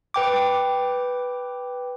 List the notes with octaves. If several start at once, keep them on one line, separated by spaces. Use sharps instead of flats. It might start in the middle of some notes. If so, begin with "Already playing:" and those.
B4 G5 D6